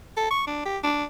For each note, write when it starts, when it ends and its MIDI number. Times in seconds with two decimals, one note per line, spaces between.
0.17 0.27 69
0.31 0.43 85
0.47 0.64 62
0.65 0.78 67
0.84 1.04 62